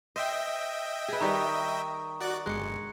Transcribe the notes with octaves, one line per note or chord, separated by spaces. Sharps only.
C5 D#5 E5 G5
G#4 B4
D#3 G3 B4 A#5 C#6 D#6
F#4 D5 F#6
G1 G#3 F#6 C#7